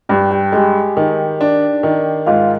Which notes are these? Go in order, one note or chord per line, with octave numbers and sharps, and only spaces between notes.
G2 G4 G5
G4 G5
G#3 G4 G5
D#3
D4
D#3
G#2 F4 F5